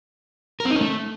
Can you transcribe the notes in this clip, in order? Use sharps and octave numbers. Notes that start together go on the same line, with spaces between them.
A#4
C4
D#4
C#4
A3